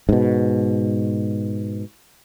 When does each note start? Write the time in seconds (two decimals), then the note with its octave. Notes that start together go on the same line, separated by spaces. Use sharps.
0.09 G#2 B2